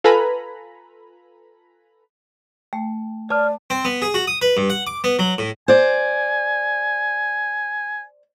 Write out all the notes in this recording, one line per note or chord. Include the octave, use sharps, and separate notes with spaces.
F4 A4 B4 G#5 A#5 B5
A3 G5
B4 C#5 D5 A5 D6 F6
C4
B3
G#4
F#4
D#6
B4
G2
F#5
D6
B3
F#3
A2
C5 D5 G#5